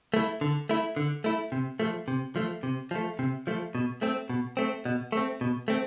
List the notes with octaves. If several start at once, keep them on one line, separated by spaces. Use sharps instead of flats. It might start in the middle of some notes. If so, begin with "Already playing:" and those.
A3 E4
D3
A3 E4
D3
A3 E4
C3
F3 A3
C3
F3 A3
C3
F3 A3
C3
F3 A3
B2
A3 C4
B2
A3 C4
B2
A3 C4
B2
A3 C4